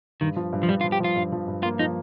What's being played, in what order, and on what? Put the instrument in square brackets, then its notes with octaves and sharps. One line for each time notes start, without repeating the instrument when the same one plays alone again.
[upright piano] G2 [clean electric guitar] D#3
[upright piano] F3
G2
[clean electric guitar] F3
[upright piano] G2 [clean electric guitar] G3
[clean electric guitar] F4
[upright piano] F3
[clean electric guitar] G4
[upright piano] F3 [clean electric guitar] F4
[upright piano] G2
F3
G2
[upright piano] A#3 [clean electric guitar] F4
[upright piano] F3 [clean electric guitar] D#4